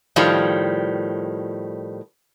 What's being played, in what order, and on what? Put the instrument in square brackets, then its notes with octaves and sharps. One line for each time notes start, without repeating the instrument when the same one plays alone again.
[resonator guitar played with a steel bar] A2 D#3 F3 G3